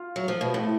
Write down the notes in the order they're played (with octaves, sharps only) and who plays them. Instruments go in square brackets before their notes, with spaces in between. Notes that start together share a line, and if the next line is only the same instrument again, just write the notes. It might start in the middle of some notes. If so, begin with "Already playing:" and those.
Already playing: [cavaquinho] F4
[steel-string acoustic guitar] F#3
F3
B2
A2